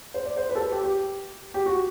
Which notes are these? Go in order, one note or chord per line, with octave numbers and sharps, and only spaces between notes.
C5
D5
C5
B4
A4
B4
G4
G4
G4
F#4